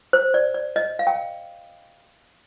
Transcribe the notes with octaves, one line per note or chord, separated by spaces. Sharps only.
C5
D5
D5
D#5
F5
G5